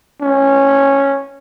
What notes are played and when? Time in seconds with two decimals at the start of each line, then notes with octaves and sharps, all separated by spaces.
0.22 C#4